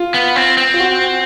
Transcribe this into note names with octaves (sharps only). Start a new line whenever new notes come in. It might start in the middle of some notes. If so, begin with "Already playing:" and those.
Already playing: F4
B3
C4
C4
F4
F#4